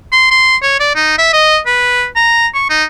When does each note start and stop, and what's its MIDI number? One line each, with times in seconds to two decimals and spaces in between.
0.12 0.26 84
0.31 0.57 84
0.62 0.79 73
0.80 0.91 74
0.95 1.17 63
1.18 1.28 76
1.33 1.59 75
1.66 2.05 71
2.16 2.47 82
2.54 2.65 85
2.69 2.84 63